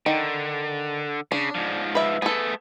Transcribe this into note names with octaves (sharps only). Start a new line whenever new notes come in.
D3 D#3
C#3 D4
G#2 F3
B4 E5
A3 B3 G#4 A4